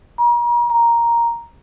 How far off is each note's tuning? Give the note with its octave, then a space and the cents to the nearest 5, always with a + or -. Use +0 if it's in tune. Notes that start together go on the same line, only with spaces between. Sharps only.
A#5 +40
A#5 +5